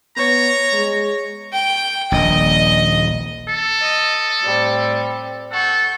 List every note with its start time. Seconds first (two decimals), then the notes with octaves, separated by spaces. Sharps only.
0.17 B3 C#5 A#5
0.73 G#3
1.53 G5
2.12 D#1 A#1 D#5
3.48 A4
3.80 D#5
4.43 A2 G3 C4
5.51 A4 F#5 C#6 G6